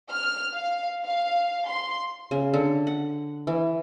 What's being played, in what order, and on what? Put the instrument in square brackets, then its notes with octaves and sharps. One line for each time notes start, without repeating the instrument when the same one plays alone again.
[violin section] F6
F5
F5
C6
[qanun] C#3
D3
F#5
E3